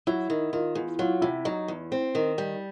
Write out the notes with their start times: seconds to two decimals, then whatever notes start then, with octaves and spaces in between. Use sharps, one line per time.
0.07 F#3 E4
0.30 D#3
0.53 D#3 F4
0.75 E2
0.99 F#3 F4
1.22 C3 E4
1.45 F#3 D#4
1.68 E2
1.92 C4
2.15 D#3
2.38 G3